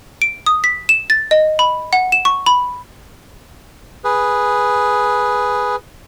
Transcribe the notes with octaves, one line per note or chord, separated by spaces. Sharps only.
D7
D#6
B6
E7
A6
D#5
B5
F#5
E7
C#6
B5
G#4 B4